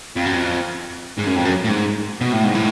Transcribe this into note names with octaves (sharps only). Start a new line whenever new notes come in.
F2
F#2
F2
G#2
F#2
F2
F#2
A2
G#2
B2
A2
G#2
A2